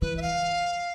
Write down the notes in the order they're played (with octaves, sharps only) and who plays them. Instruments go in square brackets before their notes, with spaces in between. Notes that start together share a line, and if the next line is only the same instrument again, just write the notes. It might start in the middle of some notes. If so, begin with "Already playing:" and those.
[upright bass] E3 [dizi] B4
[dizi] E5
F5